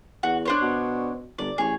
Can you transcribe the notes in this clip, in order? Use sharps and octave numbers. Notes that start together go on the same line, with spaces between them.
E2 F#4
D4 C5 C#5
B2
G1 D5
A1 G#4 C#5